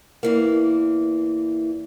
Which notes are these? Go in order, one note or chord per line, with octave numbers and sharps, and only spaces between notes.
E2 E3 A#3